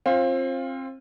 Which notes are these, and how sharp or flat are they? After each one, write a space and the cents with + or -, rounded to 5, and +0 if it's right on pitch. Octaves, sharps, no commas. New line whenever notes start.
C4 +30 F4 +0